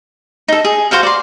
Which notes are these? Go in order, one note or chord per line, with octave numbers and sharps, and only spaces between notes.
D#4 A4
G#4
F#4 C5 F5 F#5
D5 C6